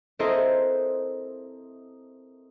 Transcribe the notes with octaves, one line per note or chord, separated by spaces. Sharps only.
C4 E4 A4 A#4 C5 D#5